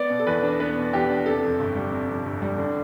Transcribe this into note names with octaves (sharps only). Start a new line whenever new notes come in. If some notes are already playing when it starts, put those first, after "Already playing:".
Already playing: B3 D5
B2
A4
E2 B4
D4
B3 B4
B2
E2 G4
D4
C3 A4
F2
G1
G3
C3
F2
G1
G3
D3